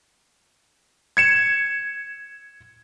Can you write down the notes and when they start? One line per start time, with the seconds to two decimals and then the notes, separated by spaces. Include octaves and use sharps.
1.17 G#6 C#7 E7